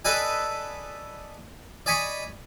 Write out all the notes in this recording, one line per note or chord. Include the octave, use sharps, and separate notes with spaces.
A4 B4 D5 D#5 G#5
D5 D#5 G#5 B5 C#6